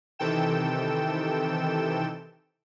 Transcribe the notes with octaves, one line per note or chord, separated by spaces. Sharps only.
C3 D#3 E3 A4 G5 E7